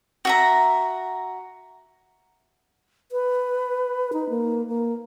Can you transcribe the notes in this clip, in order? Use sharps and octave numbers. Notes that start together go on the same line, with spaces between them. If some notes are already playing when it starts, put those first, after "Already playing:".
F#4 E5 A#5
B4
D#4
A#3
A#3